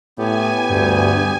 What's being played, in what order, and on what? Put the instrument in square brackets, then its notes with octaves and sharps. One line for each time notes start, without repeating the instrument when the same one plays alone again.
[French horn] A2 [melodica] B3 G4 [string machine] G#5
[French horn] D2 [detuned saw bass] G2